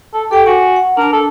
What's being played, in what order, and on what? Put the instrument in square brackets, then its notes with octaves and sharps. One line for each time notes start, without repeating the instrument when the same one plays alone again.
[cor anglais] A4
[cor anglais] G4 [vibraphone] A4 G5
[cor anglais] F#4 [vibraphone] G#5
[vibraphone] F#5
[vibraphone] D4 A5 [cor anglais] A#4
[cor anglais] A4